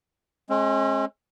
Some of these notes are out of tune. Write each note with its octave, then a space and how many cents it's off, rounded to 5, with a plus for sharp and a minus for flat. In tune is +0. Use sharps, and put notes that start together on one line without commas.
G#3 +30 C#4 -40